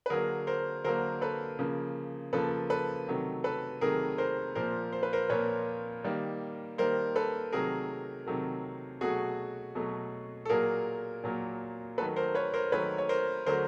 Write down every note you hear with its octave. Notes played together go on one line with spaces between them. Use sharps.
B4
D3 F#3 A#3 G#4 A#4
A#4 C5
D3 F#3 A#3 A#4 C5
A4 B4
C#3 F3 A#3
C#3 F3 A#3 A4 B4
A4 B4
C3 D#3 F#3 A3
A4 B4
C3 D#3 F#3 A3 G#4 A#4
A#4 C5
A#2 F3 A#3 A#4 C5
C5
B4
A#4 C5
A#2 F3 A#3 B4 C#5
D#3 G3 A#3
D#3 G3 A#3 A#4 C5
A4 B4
C3 D#3 F#3 A3 G#4 A#4
C3 D#3 F#3 A3
B2 F#3 A3 F#4 G#4
B2 F#3 A3
A4
A#2 F#3 A#3 G#4 A#4
A#2 F#3 A#3
D#3 F#3 A3 A4 B4
A#4 C5
B4 C#5
A#4 C5
D#3 F#3 A3 B4 C#5
C#5
A#4 C5
D3 F#3 A3 A#4 C5